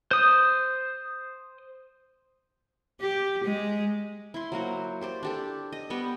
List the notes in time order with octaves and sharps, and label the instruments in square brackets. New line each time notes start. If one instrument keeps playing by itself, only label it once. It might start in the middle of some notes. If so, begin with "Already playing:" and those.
[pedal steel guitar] C5 D#6
[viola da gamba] G4
G#3
[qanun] E4 B5 C6
F#3 A#3 F#4 C5
G4 C5 D5
D4 G4 A4
D#5
G3 B3 G5 C#6